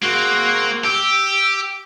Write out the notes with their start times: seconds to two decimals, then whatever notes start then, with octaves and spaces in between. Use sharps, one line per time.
0.02 C#3 A#3 C4 F#4
0.84 G4 E6